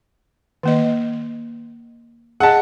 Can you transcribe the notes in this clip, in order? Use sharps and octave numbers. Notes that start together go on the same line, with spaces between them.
D#3 A#3 D#5
G#4 D#5 F#5 A5